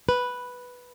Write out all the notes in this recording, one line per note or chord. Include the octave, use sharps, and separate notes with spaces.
B4